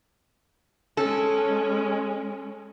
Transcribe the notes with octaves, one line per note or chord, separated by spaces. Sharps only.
G#3 C#4 A4